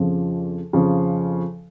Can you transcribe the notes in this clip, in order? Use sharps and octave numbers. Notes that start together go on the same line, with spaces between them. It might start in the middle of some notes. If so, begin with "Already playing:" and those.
Already playing: F2 C#3 F3
F2 C#3 F3